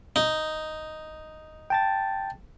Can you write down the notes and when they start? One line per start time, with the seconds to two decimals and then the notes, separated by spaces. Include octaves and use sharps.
0.16 D#4
1.70 G5 A5 A6